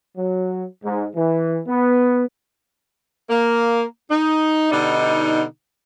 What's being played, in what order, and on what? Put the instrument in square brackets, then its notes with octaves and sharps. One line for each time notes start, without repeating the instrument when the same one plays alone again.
[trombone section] F#3
G#2
E3
B3
[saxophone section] A#3
D#4
B2 D3 G3 D#4